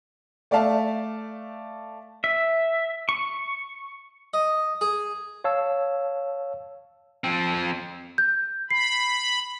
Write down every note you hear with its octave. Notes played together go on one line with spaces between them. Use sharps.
A3 D5 E5 F5 A5
E5
C#6
D#5
G#4
C#5 F5 A5 E6
F3 C4
G6
B5 C7